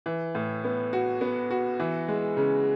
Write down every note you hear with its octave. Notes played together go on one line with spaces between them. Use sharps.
E3
A2
B3
F#4
B3
F#4
E3
G#3
C#3